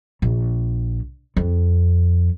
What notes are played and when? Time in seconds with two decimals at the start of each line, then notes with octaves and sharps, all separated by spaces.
0.22 A#1
1.37 F2